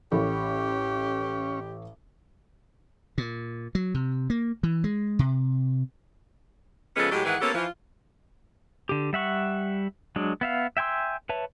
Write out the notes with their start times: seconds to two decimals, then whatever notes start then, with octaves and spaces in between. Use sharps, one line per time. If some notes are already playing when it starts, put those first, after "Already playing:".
0.12 A1 C#4 G4 A4 B5
3.18 A#2
3.75 F#3
3.94 C3
4.30 A#3
4.63 E3
4.84 G#3
5.19 C3
6.96 C#3 F3 G#3 B3 C#4 A4
7.12 A2 F#3 G#3 G4
7.25 G#2 D#3 E3 G#4 B4 F#5
7.41 A#3 B3 C#4 G4 A4
7.54 E3 F3 F4
8.89 D3 G4
9.13 G3 E5 F#5 C#6
10.16 F#3 G#3 D4
10.41 B3 E5 F5
10.77 E5 G5 G#5 C6 E6
11.29 B4 C#5 E5 A5